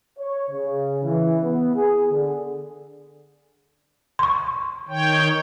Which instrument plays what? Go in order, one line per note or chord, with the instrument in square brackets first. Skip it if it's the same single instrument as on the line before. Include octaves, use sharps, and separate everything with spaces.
[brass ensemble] C#5
C#3
E3
B3
G#4
D3
[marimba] C6 C#6
[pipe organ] D#3 C#5 G5